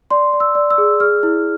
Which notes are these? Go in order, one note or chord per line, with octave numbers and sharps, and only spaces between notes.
D5 C6
D5
E6
D5
E6
G#4
G#4 F6
E4